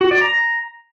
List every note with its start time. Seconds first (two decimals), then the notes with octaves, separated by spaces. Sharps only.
0.01 F#4
0.11 D5
0.21 A#5